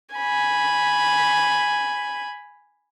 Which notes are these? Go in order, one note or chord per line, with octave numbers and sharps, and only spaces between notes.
G#5 B5